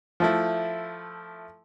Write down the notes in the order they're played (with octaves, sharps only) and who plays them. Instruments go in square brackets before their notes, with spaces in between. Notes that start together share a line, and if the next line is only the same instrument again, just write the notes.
[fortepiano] F3 A3 E4